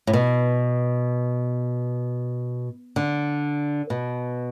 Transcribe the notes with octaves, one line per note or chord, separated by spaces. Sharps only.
A2
B2
D3
B2